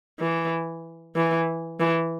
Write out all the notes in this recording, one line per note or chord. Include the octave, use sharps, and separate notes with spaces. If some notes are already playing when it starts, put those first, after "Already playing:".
E3
E3
E3